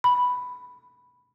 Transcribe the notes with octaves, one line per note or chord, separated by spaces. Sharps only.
B5